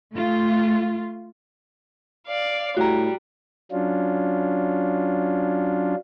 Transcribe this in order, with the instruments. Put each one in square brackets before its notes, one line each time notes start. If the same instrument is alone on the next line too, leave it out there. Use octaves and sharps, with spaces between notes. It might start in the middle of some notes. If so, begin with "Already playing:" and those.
[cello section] A3 F4
[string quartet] D5 F5
[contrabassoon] A2 [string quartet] G3 [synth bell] F#4 A#5
[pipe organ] F#3 C#4 D4 F4